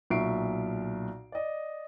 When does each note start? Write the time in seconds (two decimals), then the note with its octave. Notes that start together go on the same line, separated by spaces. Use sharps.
0.10 B1 A#2 E5 C#6 C7 D7
1.32 D5 D#5